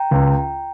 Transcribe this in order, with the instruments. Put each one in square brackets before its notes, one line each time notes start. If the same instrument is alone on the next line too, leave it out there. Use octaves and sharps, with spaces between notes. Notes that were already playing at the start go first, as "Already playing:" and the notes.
Already playing: [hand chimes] G5 A#5
[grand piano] C#2